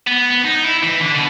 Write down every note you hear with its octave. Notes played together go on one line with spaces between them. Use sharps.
B3
B3
D#4
E4
E3
D3
B2